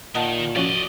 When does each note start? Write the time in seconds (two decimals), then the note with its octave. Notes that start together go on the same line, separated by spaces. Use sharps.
0.15 A#2 D#3 D#5 F#5 A5
0.56 F3 C#4 F#4 D5 D#5